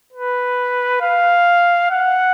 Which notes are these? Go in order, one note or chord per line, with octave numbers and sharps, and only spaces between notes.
B4
F5
F#5